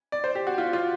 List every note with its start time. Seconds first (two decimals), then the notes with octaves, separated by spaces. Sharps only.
0.12 D5
0.24 C5
0.35 G4
0.47 F#4
0.58 F4
0.73 F4